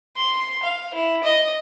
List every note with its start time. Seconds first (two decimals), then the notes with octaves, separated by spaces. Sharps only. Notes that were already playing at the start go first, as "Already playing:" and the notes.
0.16 C6
0.63 F5
0.94 E4
1.23 D#5